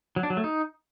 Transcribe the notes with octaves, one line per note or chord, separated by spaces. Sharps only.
F#3
D4
F#3
A3
D#4